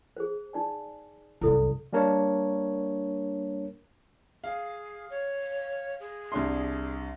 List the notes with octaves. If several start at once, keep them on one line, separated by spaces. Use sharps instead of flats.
G#4 C5
D#4 D5 G#5
C2 F#2 E4 A4 D5
G3 A#3 D4 A#4 C#5
G#4 F5
C#5
G#4
C2 D4 C6